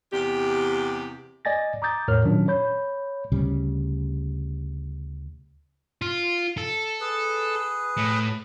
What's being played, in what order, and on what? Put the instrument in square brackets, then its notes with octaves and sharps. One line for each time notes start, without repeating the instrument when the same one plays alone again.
[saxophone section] E2 C3 G4
[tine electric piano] D5 D#5 G#5 A6 A#6
A#5 D6 D#6 G6 A6
E2 A2 A#4 C#5 F6
A#2 D#3 F#3 C#4 D4
C#5 B5 G6
[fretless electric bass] D2 C#3 G3
[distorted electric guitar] F4
A4
[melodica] G#4 B4
[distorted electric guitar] A2